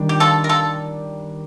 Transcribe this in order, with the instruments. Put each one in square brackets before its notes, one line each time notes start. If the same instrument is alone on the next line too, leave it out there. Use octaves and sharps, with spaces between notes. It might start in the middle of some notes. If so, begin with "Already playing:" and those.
Already playing: [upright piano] D#3 G3 D4
[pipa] G4
F4 A4
A#4
F4 A4